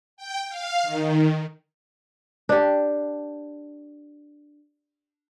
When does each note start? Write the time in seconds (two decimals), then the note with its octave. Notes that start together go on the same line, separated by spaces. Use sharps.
0.17 G5
0.49 F5
0.83 D#3
2.49 D4 G4